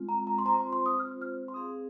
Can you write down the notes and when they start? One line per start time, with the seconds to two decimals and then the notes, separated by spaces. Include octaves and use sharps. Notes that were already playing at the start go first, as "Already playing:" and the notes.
Already playing: G#3 C4 F4
0.09 A#5
0.27 A#5
0.38 C6
0.45 C4 F4 C5 A#5
0.59 C6
0.73 C6
0.86 D#6
0.99 F6
1.21 F6
1.48 C6
1.54 C4 G#4 F5 D#6